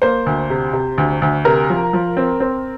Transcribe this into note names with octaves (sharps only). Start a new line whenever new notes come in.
A#3 C5
D2
C3
C3
D2
D2
C3 A#4
F3
F3
C4
C4